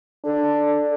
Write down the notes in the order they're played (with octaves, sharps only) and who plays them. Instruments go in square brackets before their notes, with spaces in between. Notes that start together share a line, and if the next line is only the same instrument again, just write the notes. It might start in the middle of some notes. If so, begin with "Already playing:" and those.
[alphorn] D4 [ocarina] A4